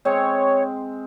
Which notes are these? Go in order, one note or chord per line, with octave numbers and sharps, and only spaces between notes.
G#3 C4 C#5